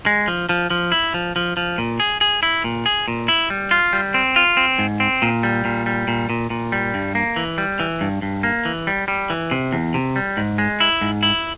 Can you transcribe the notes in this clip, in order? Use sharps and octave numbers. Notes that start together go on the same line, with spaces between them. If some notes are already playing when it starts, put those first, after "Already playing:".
G#3
F3
F3
F3
E4
F3
F3
F3
A#2
G#4
G#4
E4
A#2
G#4
A#2
E4
G3
F4
G3
C4
F4
C4
G#2
C4
A#2
G3
A#2
G3
A#2
A#2
A#2
G3
G2
A#3
E3
G3
E3
G2
G2
A#3
E3
G3
G3
E3
C3
E2
C3
G3
G#2
G#3
E4
G#2
E4